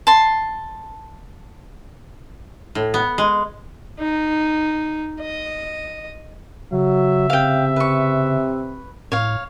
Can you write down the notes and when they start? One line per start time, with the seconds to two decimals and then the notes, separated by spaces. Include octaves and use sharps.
0.07 A5 C6
2.75 A2
2.94 B3
3.18 G#3
3.99 D#4
5.20 D#5
6.72 C#3 F#3 E5
7.30 C3 F5 G5
7.76 B4 C#6
9.12 A2 C#5 F5